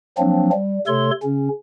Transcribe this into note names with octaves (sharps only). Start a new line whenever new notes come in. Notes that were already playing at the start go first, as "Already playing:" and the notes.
F3 F#3 A#3 C4 D4
G3
C3 A3 A4 C#5 C6
C#3 C#4